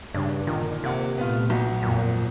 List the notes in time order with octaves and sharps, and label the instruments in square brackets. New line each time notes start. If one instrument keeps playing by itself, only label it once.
[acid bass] G2 [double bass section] C#3 [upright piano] D4
[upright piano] A#2 [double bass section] D3 [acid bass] D#3
[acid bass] C3 [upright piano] A#3 F#5
[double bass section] A#2 A3 [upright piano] B3 F4
[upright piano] B1 B2
[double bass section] G#1 F2 [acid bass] A#2